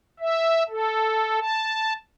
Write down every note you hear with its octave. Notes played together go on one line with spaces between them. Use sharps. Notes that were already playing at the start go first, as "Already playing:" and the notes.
E5
A4
A5